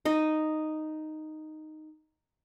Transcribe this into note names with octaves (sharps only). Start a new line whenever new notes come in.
D#4 D#5